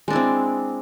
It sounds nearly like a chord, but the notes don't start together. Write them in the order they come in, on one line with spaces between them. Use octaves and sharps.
G#3 D4 E4 C4